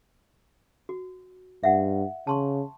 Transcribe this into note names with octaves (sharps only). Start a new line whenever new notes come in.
F#4
G2 E5 F#5
C#3 A5 C6 C#6